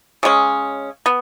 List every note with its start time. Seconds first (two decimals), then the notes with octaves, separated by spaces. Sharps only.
0.23 C#3 G#3 C#4
1.06 B3